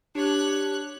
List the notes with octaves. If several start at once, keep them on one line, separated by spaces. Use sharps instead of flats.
D4 G4 C#5 F#6